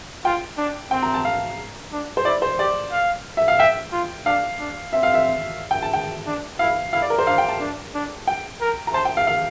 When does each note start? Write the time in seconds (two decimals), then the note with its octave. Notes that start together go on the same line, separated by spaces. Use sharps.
0.25 F4 G5
0.57 D4
0.91 C4 G5
1.03 A#5
1.14 A5
1.25 F5
1.92 D4
2.17 C5
2.25 E4 D5
2.42 C5
2.58 G4 D5
2.92 F5
3.37 E5
3.48 F5
3.59 E5 G5
3.92 F4
4.26 D4 F5
4.60 D4
4.93 C4 E5
5.03 F5
5.14 E5
5.71 G5
5.82 A5
5.93 G5
6.27 D4
6.59 E4 F5
6.93 E4 F5
7.02 D5
7.10 A#4
7.19 C5
7.26 D4 F5
7.38 G5
7.49 A5
7.60 D4
7.94 D4
8.27 G5
8.61 A#4
8.87 A#5
8.94 C5 A5
9.05 G5
9.17 F5
9.27 F5